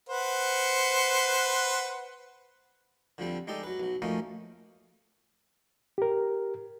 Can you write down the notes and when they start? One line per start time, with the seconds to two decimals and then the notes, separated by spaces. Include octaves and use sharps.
0.09 B4 C5 F#5
3.18 D3 F3 G3 C4
3.47 G#3 D#4 G4 A4 D5
3.63 F#3 B4
3.80 B1 F#3
4.02 F3 A3 A#3 C#4 D#4
5.98 G4 A#4